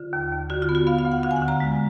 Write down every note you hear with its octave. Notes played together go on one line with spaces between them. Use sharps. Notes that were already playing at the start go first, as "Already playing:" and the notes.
Already playing: D3 F4
D#2
D#2
D3 F#4
F4
B3
F#4
B3 F5
F5
D2
F#5
D3 F5
G#5
F#5
D3
A#5
G#3